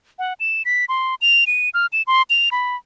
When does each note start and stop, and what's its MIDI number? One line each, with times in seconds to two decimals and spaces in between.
0.19 0.33 78
0.40 0.63 100
0.65 0.85 95
0.89 1.15 84
1.21 1.44 101
1.47 1.70 99
1.74 1.86 89
1.93 2.02 100
2.07 2.22 84
2.30 2.49 101
2.52 2.76 83